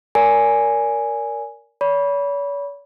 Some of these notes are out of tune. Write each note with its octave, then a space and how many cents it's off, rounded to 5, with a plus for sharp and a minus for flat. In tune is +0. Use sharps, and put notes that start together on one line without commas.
A#4 +0 D5 -35 G#5 +0
C#5 +45 B5 -15